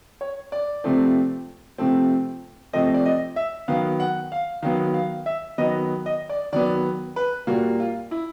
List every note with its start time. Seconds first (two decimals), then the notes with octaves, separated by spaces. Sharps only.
0.21 C#5
0.52 D5
0.84 C3 F3 A3 C4
1.78 C3 F3 A3 C4
2.73 C3 F3 A3 C4 D#5
2.94 D5
3.05 D#5
3.36 E5
3.68 D#3 F#3 B3 F5
4.00 F#5
4.32 F5
4.62 D#3 F#3 B3 F5
4.94 F5
5.26 E5
5.58 D#3 F#3 B3 D#5
6.06 D#5
6.29 D5
6.52 D#3 F#3 B3 D5
7.16 B4
7.47 A#2 G3 A#3 F#4
7.80 F4
8.11 E4